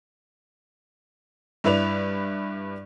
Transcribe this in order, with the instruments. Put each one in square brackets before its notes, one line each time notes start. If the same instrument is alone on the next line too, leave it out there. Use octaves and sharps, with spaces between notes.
[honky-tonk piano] G2 E4 B4 D5 F7